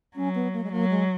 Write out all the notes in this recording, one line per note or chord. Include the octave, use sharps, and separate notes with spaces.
F#3 C#4
B3
A#3
G#3
F#3 A#3
G#3